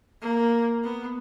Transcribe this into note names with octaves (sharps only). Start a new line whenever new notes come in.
A#3
B3